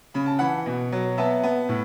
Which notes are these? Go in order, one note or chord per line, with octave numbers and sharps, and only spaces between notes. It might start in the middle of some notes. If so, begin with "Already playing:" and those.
C#3 B5
A5
E3 F#5 B5
B2
F#3
B3 E5 A5
B3
A2